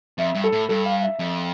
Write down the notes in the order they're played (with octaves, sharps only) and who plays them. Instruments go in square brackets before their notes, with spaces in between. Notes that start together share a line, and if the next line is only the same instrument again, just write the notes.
[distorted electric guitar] F2 [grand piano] E5
[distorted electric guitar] G2
[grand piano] A4
[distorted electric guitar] A2
[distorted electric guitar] G2 [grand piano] A4
[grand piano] F5
E5
[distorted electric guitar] F2